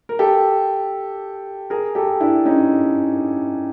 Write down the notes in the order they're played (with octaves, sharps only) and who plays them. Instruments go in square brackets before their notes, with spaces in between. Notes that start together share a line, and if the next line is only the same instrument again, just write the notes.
[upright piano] A#4
G4 A4
G#4 A#4
G4 A4
D4 E4
C#4 D#4